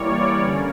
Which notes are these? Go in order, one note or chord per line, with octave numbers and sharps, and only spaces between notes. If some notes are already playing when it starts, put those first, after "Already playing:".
Already playing: E3 G3 A#3 C#5 D5
D3 A#3 C#4